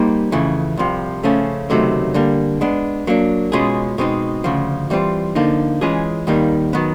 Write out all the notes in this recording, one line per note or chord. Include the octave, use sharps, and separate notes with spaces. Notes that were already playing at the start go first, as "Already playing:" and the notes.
Already playing: G3 A#3 D#4 G#4 C5
F2 C#3 E3 A3
C2 C3 F3
C#3 F3 A3 C#4
C#2 C3 D#3 F#3 A3
D3 G3 A#3
G#3 B3 D4
F#3 A#3 D4
B2 G#3 C#4 F4 G#4
B2 G#3 C4 D#4
D2 C#3 F3
E3 G3 C4 F4
D3 F3 A#3 D#4
E3 G#3 C#4 F4 G#4
D#2 D#3 G3 A#3 D#4
D#3 F#3 B3